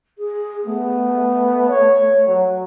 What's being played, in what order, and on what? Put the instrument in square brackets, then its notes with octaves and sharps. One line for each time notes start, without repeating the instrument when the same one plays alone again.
[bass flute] G#4
[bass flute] A3 [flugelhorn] B3
[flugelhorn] C#5
F#3